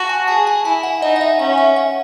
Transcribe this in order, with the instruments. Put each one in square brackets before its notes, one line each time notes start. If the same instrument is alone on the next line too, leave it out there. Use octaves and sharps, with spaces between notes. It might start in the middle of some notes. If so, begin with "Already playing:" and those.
Already playing: [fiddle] F#4 [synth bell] A5
[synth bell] G#5
[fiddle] G#4 [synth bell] A5
[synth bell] G#5
[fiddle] E4 [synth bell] G#5
[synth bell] F#5
[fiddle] D#4 [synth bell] D#5
[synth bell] F#5
E5
[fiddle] C#4 [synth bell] F#5
[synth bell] E5
F#5